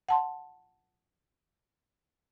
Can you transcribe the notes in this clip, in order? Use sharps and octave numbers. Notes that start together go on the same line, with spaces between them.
F#5 A5 C6